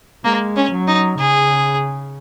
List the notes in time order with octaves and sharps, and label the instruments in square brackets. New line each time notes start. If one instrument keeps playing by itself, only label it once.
[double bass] G#3 [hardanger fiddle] A#3
[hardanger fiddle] C#4
[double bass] F#3
[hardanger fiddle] D#4
[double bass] C#3 [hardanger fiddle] G#4